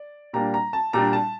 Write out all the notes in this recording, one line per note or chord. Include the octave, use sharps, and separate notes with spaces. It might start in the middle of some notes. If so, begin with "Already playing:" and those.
Already playing: D5
A#2 G3 A#3 D4 A#5
A#5
A5
A#2 G3 D4 A#5
A5